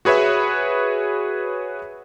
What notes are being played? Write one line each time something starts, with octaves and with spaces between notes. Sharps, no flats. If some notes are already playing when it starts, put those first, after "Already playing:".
F#4 G#4 B4 C#5 E5